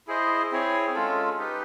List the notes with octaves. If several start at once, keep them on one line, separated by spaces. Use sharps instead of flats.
E4 G#4 C5 D#5
C4 E4 G#4 C#5
G#3 C#4 F4 A4
D#4 G4 B4